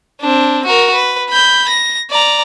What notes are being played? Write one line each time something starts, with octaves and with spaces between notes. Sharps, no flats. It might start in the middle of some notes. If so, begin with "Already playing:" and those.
C4 D4
F#4 A#4
B4
B5 G6
A#6
D5 A#5